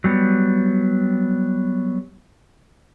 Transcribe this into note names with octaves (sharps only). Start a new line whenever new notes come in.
F#3 G3 B3